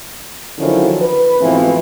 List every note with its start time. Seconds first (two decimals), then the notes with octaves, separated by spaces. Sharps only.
0.58 D3 D#3 F3 F#3 C#4 E4
1.00 B4
1.40 G#2 B2 E3 F3 A3 C4